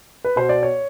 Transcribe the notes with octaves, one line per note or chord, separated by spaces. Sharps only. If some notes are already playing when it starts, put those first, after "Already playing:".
B4
B2 C5
D5
C#5